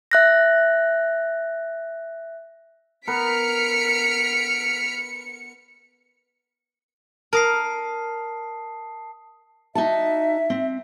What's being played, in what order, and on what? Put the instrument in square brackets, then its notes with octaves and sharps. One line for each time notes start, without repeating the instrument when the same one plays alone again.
[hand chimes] E5 F#6 A#6
[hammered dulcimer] B3 A#4 [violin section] F6 B6 D7 [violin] C#7
[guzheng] A#4 [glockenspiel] A5 D#6 C7
[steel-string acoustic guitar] D#4 F#4 A5 [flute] E5
[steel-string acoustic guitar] C4